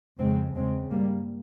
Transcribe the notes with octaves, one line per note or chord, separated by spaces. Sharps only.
F2 C#3 G#3 C4
E2 C#3 G#3 C4
G2 G3 A#3